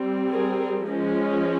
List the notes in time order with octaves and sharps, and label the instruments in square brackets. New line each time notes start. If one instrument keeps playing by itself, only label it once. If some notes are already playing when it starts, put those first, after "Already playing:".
Already playing: [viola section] G3 C4
G#4 A#4
F3 G#3 C#4